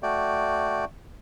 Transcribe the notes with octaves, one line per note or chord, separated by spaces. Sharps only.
A3 F#4 D5 G5